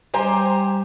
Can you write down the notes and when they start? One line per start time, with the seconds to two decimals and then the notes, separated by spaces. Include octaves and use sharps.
0.14 G3 G4 C5 G#5 A#5